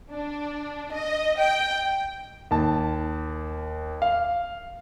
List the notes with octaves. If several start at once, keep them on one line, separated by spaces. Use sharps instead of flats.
D4
D#5
G5
D#2 A5
F5